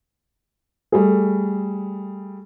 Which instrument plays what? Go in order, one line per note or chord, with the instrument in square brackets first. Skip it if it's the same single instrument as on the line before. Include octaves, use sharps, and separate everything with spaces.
[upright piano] G3 A3 G#4